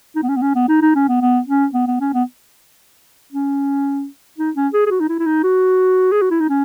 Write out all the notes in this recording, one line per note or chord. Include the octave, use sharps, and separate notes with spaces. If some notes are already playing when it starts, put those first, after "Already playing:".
D#4
B3
C#4
B3
C#4
B3
D#4
D#4
C#4
B3
B3
C#4
B3
B3
C#4
B3
C#4
D#4
C#4
G#4
G#4
F#4
D#4
E4
E4
D#4
F#4
G#4
F#4
E4
D#4
C#4